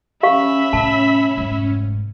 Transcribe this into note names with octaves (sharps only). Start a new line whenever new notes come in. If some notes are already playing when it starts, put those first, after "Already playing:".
C#4 G4 E5 F5 B5 C#6
A2 C3 A5
F1 G#2